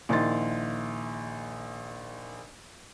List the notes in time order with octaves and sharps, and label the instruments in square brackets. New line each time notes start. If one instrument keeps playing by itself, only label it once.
[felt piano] A#1 D#3 E4 D#5 C6 A6